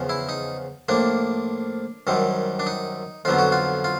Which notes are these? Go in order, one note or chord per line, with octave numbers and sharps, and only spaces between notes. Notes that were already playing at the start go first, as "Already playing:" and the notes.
Already playing: E2 C#3 F3
E4
D#4
A2 F3 A#3 D4
F#2 D#3 G3 C4
D4
D#4
F2 D3 F#3 B3 F4
F#4
F4
F4